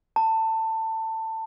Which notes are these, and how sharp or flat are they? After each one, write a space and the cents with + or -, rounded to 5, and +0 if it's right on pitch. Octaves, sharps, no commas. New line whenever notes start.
A5 +20